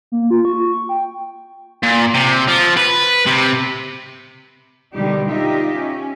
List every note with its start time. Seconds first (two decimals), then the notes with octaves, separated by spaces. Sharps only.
0.12 A#3
0.31 F4
0.45 C#6
0.89 G5
1.83 A#2
2.14 C3
2.48 F3
2.77 B4
3.27 C3
4.93 B2 D3 D#3 G3 D#4 G4
5.26 D#4 F4 G4 D#5 E5
5.76 C#4